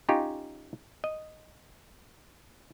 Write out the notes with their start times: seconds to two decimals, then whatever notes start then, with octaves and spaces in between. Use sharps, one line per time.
0.09 C#4 D#4 F4 G4 C#5
1.04 D#5